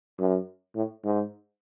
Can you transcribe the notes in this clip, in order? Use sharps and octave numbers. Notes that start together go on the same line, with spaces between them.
F#2
A2
G#2